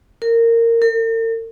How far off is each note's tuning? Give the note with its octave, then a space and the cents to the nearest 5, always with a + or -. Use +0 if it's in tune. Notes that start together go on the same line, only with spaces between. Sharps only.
A#4 -20
A#4 -45